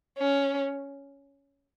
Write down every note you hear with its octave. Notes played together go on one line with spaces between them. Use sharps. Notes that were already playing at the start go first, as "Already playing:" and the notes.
C#4